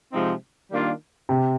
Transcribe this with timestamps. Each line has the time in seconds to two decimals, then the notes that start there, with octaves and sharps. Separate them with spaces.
0.12 C3 F3 G#3 C4 D#4
0.70 D#3 G3 A#3 D4 F4
1.29 C3